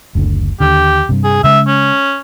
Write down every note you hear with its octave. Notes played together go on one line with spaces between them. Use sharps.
F#1 D2 D3
D#2 D3 G4
G2 C3
G#4
C#3 G#3 E5
C#4